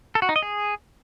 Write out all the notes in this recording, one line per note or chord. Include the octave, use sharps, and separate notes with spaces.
A4
F#4
D#4
D#5
G#4